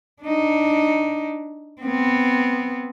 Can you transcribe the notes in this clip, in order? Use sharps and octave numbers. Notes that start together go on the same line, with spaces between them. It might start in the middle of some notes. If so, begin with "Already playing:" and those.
D4 D#4
B3 C4